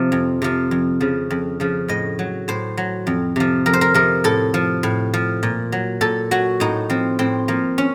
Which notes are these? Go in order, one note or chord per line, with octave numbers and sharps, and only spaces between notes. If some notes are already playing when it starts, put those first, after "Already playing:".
Already playing: C3 F3
F2
C3 F3
F2
C#3 F3
F2
C#3 F3
A2 D#5
F#3
A2 C5
F#3
F2
C3 F3
F2 A#4
C5
A#4
C3 F3 A#4
A2 A4
F3
A2
F3
A#2
F#3
A#2 A4
F#3 F#4
A2 D#4
F3 C4
A2 C4
F3 A#3
C#4